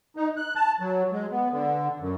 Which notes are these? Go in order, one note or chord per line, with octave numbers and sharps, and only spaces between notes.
D#4
F#6
A5
F#3
G#3
B3
D3
F#2